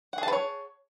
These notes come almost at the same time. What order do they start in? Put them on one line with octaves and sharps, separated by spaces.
F#5 G#4 A5 B4 C#5